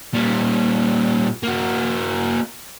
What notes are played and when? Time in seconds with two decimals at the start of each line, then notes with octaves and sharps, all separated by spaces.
0.14 A#2 G3
1.43 A#3 F#4